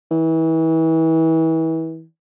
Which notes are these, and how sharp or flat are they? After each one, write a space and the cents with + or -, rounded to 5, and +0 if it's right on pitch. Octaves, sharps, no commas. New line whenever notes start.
E3 -30